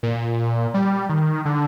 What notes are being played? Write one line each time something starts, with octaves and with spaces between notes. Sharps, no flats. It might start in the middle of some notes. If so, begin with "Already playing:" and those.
A#2
G3
D#3
D3